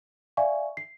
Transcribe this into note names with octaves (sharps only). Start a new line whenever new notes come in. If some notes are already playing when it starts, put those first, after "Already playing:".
D5 E5 F5 G#5 C#6
C7